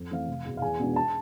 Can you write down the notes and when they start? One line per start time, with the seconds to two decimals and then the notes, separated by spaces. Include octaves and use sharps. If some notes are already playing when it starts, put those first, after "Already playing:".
Already playing: F2
0.11 E3 A3 C4 F5
0.28 F1
0.45 E2 B2
0.57 F5
0.61 E2 G#5
0.79 B2 G#3 D4
0.96 A5